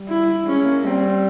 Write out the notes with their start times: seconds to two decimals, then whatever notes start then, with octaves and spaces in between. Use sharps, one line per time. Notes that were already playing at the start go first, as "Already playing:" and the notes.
Already playing: G3
0.09 E4
0.46 G#3 C#4
0.65 A#3
0.85 G3 C4